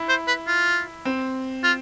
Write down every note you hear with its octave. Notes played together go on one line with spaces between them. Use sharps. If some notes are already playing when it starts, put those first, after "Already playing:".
Already playing: E4
C5
B4
F4
C4
F4